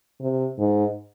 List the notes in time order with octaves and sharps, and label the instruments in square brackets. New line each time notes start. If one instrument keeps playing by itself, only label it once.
[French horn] C3
G#2